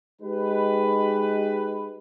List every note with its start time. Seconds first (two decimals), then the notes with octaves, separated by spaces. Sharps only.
0.22 G#3 D#4 G4 B4